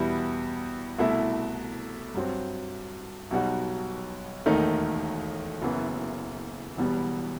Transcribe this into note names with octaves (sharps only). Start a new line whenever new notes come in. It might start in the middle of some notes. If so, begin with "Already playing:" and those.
Already playing: E2 B2 G3 B3 E4
C2 B2 A3 E4
G2 F#3 C4
B1 B2 G3 D#4 F#4
E1 D#2 D#3 A3 D#4
F#1 F#2 E3 B3
E1 E2 B2 G3 B3